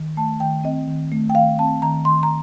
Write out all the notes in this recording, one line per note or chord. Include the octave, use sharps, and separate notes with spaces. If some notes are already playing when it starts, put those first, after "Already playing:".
Already playing: D#3
A3 A5
D#3 G5
C4 D#5
D#3
A3
G5
D#3 F5
C4 A5
D#3 A#5
D#3 C6
A#5